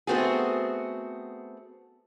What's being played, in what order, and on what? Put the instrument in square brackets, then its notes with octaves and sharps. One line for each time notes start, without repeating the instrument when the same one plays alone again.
[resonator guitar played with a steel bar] A3 B3 C4 F#4 G#4